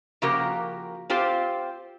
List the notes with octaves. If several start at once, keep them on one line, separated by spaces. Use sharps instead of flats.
C#3 F3 A#3 F#4 G4 A#4
C4 F4 G4 C5